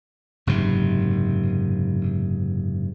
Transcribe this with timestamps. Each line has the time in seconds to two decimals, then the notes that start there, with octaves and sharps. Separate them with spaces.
0.47 F#1 G#2 C3